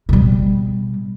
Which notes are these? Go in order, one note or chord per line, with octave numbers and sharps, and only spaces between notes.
B2 G3